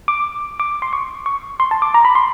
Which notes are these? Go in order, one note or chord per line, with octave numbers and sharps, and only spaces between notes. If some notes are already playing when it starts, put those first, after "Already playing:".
D6
D6
C6
C#6
C#6
C6
A5
D6
A#5
B5
C6